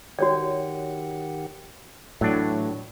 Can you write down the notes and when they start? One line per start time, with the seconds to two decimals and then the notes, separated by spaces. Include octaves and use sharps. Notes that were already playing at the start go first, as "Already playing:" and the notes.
0.19 D#3 F#4 G4 C#5 D5 F#5
2.21 A2 E3 F#3 D4